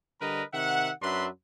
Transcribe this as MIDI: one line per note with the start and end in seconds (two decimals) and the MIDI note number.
0.21 0.43 50
0.21 0.43 55
0.21 0.43 70
0.21 0.43 71
0.21 0.43 75
0.21 0.43 82
0.53 0.91 48
0.53 0.91 51
0.53 0.91 76
0.53 0.91 78
1.02 1.28 42
1.02 1.28 54
1.02 1.28 62
1.02 1.28 71
1.02 1.28 76
1.02 1.28 84